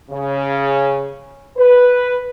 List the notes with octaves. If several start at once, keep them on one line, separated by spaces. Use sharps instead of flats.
C#3
B4